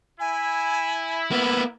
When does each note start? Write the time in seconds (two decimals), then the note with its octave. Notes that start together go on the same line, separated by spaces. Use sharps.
0.20 E4 G#5
1.32 A#3 B3 B5